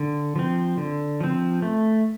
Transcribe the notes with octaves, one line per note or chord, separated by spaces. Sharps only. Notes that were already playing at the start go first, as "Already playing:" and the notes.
Already playing: D3
F3 C4
D3
F3 C4
A3